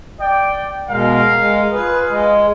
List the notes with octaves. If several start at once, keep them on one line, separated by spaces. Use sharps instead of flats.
D5 G5
B2 G#3 A#4 F5
G#3
F4 G#4 B4 F5
G#3